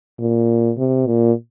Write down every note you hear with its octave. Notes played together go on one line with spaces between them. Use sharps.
A#2
C3
A#2